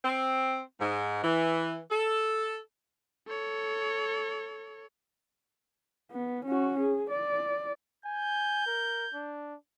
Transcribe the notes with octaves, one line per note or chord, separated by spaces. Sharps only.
C4
G#2
E3
A4
A4 C#5
B3
C#4 F#4
G#4
D5
G#5 G6
A#4
D4